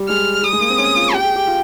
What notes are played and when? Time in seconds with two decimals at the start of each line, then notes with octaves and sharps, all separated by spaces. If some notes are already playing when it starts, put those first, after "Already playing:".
Already playing: G3
0.08 G#3 F6
0.43 G3 D#6
0.53 G#3
0.60 A#3
0.70 C4
0.78 C#4
0.96 F4
1.13 G4 G5
1.24 G#4
1.36 G4
1.47 F4